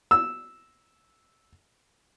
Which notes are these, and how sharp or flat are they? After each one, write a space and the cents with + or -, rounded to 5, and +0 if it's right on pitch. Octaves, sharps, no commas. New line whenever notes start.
E6 -5